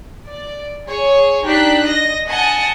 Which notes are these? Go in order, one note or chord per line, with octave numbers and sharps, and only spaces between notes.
D5
G#4 C#5
D4 D#4 G4 F#6 B6
D#5 A#6
D#5 F#5 G#5 A5 C#7